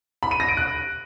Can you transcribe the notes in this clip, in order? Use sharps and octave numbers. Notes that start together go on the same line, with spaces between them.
B5
D#7
A#6
D7
F#6